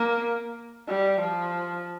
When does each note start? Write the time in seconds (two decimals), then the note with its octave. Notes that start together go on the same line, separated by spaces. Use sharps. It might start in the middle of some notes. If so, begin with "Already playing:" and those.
Already playing: A#3
0.89 G3
1.21 F3